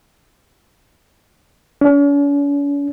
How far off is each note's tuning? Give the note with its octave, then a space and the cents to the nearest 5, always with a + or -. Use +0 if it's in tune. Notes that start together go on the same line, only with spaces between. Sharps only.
C#4 +45